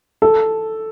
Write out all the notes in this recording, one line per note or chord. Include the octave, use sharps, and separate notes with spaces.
A4